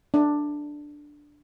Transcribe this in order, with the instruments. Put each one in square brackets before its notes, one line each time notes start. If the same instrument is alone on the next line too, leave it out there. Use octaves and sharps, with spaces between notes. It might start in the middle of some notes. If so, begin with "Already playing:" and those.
[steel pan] D4